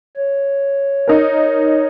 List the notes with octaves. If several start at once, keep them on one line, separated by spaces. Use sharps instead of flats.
C#5
D#4 A#4